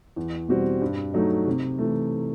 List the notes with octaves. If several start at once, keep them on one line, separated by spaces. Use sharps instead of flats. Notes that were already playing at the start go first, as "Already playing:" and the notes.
E2
B2 G3 C4 F#4
G2
F#3 A3 D#4
C3
E3 A3